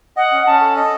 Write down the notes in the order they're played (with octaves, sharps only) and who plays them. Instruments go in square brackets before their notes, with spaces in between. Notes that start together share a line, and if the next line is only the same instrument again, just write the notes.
[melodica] D#5 [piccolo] F#5
[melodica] C#4
[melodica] C#4 [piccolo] A5
[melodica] A4
D#5